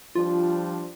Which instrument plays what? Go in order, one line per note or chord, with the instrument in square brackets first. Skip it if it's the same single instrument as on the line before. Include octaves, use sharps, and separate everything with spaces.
[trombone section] F3 G3 D4 [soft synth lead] F4